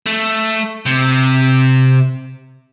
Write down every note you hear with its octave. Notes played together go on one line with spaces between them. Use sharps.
A3
C3